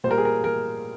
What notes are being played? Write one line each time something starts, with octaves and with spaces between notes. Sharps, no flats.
A#2 G3 A#4 C5
G#4
A#4
A#4